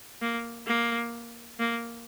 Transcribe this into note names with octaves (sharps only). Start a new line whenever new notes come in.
A#3
A#3
A#3